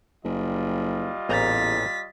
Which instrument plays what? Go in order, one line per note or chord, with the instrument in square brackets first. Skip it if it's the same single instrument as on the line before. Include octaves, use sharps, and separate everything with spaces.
[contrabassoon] F#1 [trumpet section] G3 F4 D#5
[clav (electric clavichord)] A1 A#2 A#5 [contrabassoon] E2 [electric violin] A6 B6